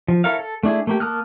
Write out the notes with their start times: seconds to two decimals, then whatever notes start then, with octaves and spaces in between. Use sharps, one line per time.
0.08 F3
0.24 E4 A4 A#4 C#5 F5
0.39 A4
0.63 A3 D4 E4 G#4
0.87 A3 A#3 G4
1.00 A#3 A5 D#6 F6 F#6